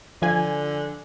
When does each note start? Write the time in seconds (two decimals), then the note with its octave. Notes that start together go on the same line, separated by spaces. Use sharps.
0.22 D3 F3 G#5